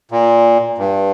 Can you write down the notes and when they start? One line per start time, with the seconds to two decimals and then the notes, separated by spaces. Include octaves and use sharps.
0.12 A#2
0.78 G2